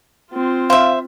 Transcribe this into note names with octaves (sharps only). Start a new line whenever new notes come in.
C4 F4
C5 E5 F5